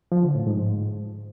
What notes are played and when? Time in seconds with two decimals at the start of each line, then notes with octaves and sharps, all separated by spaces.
0.12 F3
0.23 D3
0.35 A2
0.47 G#2